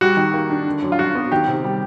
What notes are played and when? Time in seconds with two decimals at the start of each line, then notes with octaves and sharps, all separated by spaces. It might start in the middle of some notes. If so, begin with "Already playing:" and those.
0.01 G3 F#4
0.17 D#3
0.34 A#3
0.50 D4
0.66 D3
0.82 F#2
0.92 F4
0.98 F#3 F#4
1.15 B3
1.32 D#3 G4
1.47 C3
1.64 G3